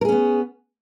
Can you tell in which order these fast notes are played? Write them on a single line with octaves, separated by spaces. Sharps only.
A#4 G#4 C#4 B3